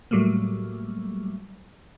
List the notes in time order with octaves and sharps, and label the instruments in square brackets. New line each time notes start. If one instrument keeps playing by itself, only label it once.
[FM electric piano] A2 F#3 G3 A3 A#3